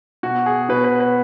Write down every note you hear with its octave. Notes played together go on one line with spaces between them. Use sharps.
B2 F#4
G#4
B2 B4
B4
B4